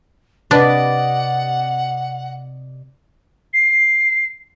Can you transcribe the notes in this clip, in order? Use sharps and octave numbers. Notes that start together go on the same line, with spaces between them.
C3 D4 B4 D5 D#5 F#5
C7